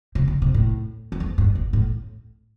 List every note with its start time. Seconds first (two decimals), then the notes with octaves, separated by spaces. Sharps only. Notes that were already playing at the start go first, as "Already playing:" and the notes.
0.15 C3
0.28 D3
0.42 C3
0.54 A2
1.12 E2
1.20 F2
1.38 G2
1.55 B2
1.73 A2